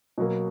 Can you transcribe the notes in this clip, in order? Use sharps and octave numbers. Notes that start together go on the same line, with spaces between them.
B2 F#3 A#3